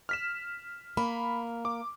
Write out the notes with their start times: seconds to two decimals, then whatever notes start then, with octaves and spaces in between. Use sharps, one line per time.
0.09 F6 B6 E7
0.97 A#3 B5
1.65 D6